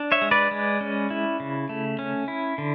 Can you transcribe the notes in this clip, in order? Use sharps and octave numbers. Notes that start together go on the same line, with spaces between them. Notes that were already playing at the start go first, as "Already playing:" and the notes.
Already playing: D4
C#5 E5
G#3
B4 D5
G#3
C#4
E4
C#3
A3
C#4
E4
D3